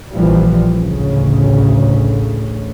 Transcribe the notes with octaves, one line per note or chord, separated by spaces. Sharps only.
A#1 A#2 E3 F3 G3
A1 D2 C#3